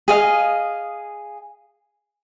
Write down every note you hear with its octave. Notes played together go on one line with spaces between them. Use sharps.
G#4 D#5 F5